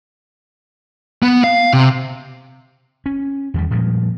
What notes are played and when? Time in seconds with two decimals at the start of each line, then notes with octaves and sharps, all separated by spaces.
1.22 B3
1.44 F5
1.73 C3
3.06 C#4
3.54 E2 D#3 G3
3.71 A#2 F3 G3 G#3